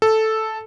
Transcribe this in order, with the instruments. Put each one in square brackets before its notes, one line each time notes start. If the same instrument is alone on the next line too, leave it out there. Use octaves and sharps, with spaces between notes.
[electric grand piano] A4